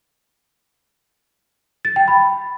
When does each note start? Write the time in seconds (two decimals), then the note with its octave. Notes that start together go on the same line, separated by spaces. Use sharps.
1.85 A6
1.96 G5
2.08 B5